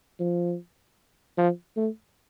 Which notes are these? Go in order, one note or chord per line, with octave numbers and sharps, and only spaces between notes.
F3
F3
A3